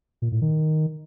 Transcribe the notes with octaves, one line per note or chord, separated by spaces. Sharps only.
A#2
A2
D#3